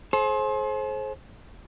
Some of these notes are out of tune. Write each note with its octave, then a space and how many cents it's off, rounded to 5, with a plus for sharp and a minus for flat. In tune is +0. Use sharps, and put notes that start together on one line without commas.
G#4 +45 C5 +25